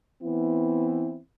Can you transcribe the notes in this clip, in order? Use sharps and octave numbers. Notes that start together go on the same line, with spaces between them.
E3 B3 C4 E4